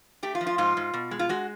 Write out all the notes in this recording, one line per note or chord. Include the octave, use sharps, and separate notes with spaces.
A3 G4
F4
F3
F4
G#2 F4
G#2
B2
G#3
F4
G#3 F#4